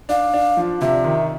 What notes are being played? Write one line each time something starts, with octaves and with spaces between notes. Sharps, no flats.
D4 F5
D4
F3
C3 E5
D#3